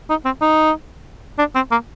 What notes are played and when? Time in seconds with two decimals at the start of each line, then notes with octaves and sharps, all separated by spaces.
0.10 D#4
0.25 C4
0.42 D#4
1.39 D4
1.55 C4
1.72 A#3